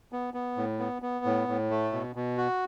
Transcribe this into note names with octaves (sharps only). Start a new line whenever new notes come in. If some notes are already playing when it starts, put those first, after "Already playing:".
B3
B3
A2
B3
B3
A2
A2
A3
B2
B2
F#4